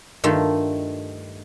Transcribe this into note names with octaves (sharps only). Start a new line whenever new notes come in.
G2 D#3 A3 F4